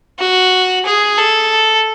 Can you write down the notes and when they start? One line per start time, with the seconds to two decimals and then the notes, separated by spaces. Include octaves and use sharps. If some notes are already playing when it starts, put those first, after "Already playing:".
0.19 F#4
0.86 G#4
1.18 A4